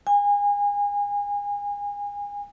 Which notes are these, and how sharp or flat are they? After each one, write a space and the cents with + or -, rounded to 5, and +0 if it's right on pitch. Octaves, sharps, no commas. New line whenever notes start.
G#5 -30